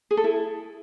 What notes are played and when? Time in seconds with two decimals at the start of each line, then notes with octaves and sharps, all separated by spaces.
0.11 G#4
0.17 A4
0.24 E4